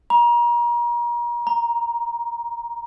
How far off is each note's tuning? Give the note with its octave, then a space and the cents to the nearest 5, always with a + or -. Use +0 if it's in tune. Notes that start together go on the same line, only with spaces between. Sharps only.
A#5 +35
A#5 +5